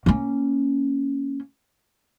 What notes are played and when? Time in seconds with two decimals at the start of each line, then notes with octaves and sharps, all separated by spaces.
0.06 A#3 C#4